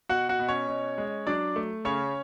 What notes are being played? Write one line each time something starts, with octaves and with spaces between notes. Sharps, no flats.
B2 F#4 F#5
F#4 F#5
B2
C#4 C#5
B2
G#3
F#3 D4 D5
A3
C#3 C#4 C#5